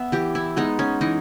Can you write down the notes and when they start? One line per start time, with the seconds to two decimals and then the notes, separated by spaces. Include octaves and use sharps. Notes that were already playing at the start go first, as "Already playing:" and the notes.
Already playing: B3 E5
0.12 E3 G4
0.35 E4
0.56 G#3 B3 D#4
0.79 C#4
1.01 E3 D#4